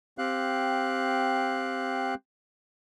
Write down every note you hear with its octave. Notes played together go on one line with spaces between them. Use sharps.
C4 G4 F5 F#6